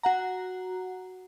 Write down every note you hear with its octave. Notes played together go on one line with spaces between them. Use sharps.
F#4 F#5 A#5